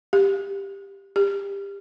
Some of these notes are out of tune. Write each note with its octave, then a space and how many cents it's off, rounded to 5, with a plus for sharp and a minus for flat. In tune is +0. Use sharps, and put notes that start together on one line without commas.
G4 +10
G4 +25